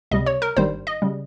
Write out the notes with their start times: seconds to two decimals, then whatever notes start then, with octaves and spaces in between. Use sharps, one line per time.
0.11 C#2 C3 G3 D#5
0.26 C#5
0.42 A#4
0.57 G#1 G2 D#3 G3 C5
0.87 D#5
1.02 C#3 G3